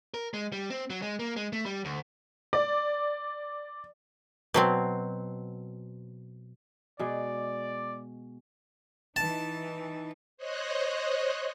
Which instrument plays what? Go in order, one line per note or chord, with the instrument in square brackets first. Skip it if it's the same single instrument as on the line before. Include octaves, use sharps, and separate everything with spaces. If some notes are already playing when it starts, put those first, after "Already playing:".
[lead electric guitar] A#4
G#3
G3
C4
F#3
G#3
A#3
G#3
A3
G3
D2
[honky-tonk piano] D5
[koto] B2 F#3 C4
[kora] B2 G#3 [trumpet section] D5
[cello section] E3 D#4 [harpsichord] A5
[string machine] C5 C#5 D#5 F#6